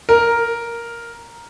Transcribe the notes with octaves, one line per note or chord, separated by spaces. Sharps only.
A#4